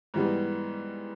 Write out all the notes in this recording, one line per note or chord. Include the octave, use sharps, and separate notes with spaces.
G#2 E3 G3 B3